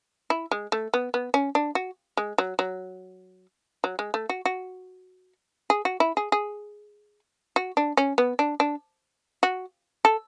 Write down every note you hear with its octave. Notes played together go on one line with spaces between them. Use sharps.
E4
G#3
A3
B3
B3
C#4
D4
F#4
G#3
F#3
F#3
F#3
G#3
A3
F#4
F#4
G#4
F#4
E4
G#4
G#4
F#4
D4
C#4
B3
D4
D4
F#4
A4